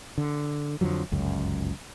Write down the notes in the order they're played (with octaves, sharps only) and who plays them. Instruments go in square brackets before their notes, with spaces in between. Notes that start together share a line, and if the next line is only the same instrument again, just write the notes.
[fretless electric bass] D3
F2 D3 F3 F#3
G1 C#2 F#2